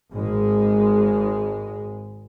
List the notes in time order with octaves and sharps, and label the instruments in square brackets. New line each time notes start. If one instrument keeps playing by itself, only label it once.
[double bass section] G#1 G#3